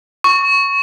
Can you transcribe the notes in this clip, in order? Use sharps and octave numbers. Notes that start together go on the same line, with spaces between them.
C#6